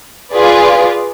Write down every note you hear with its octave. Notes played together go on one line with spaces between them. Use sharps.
F4 G#4 B4 D5